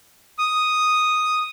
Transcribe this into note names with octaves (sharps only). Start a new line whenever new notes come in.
D#6